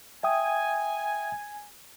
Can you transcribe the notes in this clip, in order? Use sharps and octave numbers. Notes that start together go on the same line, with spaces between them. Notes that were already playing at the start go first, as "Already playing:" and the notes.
E5 G5 G#5 D#6